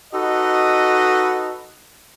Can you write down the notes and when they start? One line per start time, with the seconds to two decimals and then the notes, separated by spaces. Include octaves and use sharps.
0.13 D#4 F#4 A4 B4 D#5